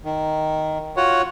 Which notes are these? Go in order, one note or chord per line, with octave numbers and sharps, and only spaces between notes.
D#3
F4 F#4 C#5 F#5